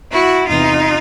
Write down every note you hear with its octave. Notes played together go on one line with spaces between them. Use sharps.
E4 F#4
E2 C3 E3 D#4 F4